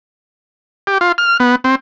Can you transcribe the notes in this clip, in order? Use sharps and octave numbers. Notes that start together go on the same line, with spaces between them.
G4
F4
F6
B3
C4